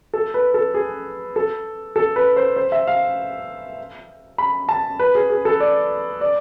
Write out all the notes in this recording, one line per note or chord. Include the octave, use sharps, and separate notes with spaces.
A4
B4
A4
G#4
A4
A4
B4
C5
C5
E5
F5
B5
A5
B4
G#4
G#4
A4
D5
D5